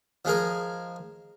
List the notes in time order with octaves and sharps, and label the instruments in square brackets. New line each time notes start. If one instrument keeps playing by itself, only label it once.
[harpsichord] F3 G#3 G#4 A#4